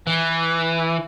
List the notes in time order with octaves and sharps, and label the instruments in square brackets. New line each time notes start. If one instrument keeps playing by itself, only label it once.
[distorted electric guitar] E3